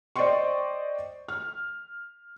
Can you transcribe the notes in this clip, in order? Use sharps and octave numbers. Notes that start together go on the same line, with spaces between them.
C5 D5 D#5 G5 C6 C#6
F6